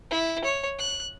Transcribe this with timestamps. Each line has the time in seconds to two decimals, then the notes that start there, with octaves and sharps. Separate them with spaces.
0.11 E4
0.44 C#5
0.79 F#6